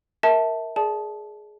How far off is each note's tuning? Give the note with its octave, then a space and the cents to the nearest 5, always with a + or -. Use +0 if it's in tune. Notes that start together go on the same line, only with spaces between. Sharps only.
A#4 +0 E5 -25 A5 +0
G#4 +20 D5 +0 A5 -20